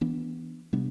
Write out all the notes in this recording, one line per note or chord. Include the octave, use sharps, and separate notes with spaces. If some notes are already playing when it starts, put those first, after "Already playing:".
E3 B3 D4
C3 G3 B3 D4